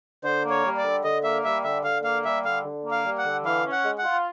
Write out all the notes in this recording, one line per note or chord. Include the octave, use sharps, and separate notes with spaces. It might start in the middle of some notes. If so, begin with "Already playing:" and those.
D3 C5
A#3
C#5
G3
D5
D3
D3 D#5
A#3 E5
G3 E5
D3 E5
D3 F5
A#3 F5
G3 E5
D3 F5
D3
A#3
F5
G3
F#5
D3
E3 F5
C#4
F#5
G#3
F#5
F4